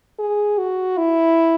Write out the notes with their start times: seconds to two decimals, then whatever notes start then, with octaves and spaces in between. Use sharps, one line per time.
0.19 G#4
0.58 F#4
0.98 E4